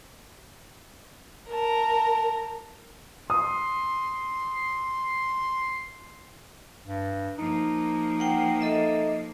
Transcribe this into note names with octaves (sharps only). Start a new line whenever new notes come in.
A#4 A5
C6 D#6
G2
F3 A#3 D#4
F#5 G5
A4 D#5 E5